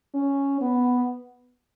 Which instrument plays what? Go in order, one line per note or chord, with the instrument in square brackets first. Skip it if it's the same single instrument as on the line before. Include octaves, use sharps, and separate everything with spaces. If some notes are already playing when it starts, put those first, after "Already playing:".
[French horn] C#4
B3